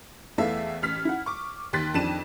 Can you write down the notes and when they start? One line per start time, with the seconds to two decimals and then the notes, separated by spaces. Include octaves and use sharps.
0.38 E2 E3 A3 A4 E5 F5
0.82 A1 F6 B6
1.05 E4 F#5
1.26 C#6 D6
1.73 D#2 C6 F#6 A6 B6
1.94 F2 D#3 D4 A5 D#7 E7